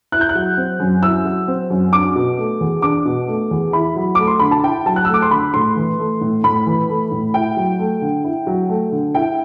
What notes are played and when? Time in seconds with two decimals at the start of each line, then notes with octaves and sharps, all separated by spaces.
0.12 E4 F#6
0.21 G6
0.29 F#6
0.35 F#3
0.57 C4
0.80 F#2
1.03 E4 E6
1.25 F#3
1.48 C4
1.70 F#2
1.93 D4 D6
2.15 B2
2.38 A3
2.61 E2
2.82 D4 D6
3.06 B2
3.28 A3
3.51 E2
3.73 E4 B5
3.96 F#3
4.15 A3 D6
4.27 C6
4.40 D3 B5
4.51 A5
4.64 E4 G5
4.86 F#3 A5
4.96 F#6
5.05 E6
5.09 A3
5.14 D6
5.22 C6
5.31 D3 B5
5.54 A2 C6
5.76 E3
5.99 A3
6.21 A2
6.44 A2 B5
6.66 E3
6.89 A3
7.12 A2
7.34 E4 G5
7.57 F#3
7.79 A3
8.02 D3
8.24 E4
8.47 F#3
8.69 A3
8.92 D3
9.15 E4 G5